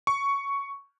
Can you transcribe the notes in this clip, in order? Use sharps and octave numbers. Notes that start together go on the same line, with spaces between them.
C#6